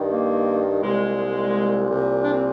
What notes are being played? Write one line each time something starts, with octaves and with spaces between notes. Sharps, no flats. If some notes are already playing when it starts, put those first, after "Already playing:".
Already playing: G2 D#3
A#3
C2 A#2 G#3
C2 A#2
D4
C4